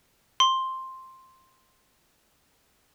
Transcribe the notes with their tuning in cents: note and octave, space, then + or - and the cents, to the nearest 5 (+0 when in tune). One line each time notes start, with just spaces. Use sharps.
C6 +5